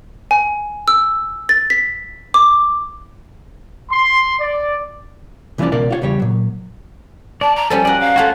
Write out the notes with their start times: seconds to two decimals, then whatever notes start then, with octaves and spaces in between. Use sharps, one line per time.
0.31 G#5
0.88 E6
1.49 A6
1.70 B6
2.34 D6
3.91 C6
4.39 D5
5.58 C2 E3 F3 A#3 C#4 D5
5.72 C#2 B2 A#4 D5
5.90 F4 F#4 C#5
6.02 E2 C#3 G3 C#5
6.20 A#2 F#3
7.41 D5 A5
7.56 A#5
7.70 F3 G3 C#4 A4 G#5
7.85 F#2 A#4 D5 F#5
8.00 F5
8.16 A3 F4 F#4 C#5 F#5 F#6